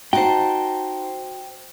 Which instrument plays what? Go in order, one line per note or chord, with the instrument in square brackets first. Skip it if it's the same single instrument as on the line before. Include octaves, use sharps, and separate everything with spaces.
[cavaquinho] D#4 A5 [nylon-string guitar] F#4 [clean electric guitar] C5 G5